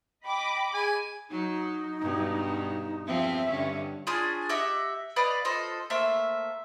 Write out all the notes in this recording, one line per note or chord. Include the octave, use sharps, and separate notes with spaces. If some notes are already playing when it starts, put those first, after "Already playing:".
D#5 G5 B5 D6
G#4 G#5
F#3 D#4
G2 B2
E2 F3 C4 E5
G2 D3 C#4
C#4 D4 F4 G#4
G4 D#5 E5 F#5
B4 D5 D#5 F5
F4 A4 C5 D#5
A3 A#3 C5 E5